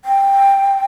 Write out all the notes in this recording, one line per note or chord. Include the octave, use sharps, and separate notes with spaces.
G5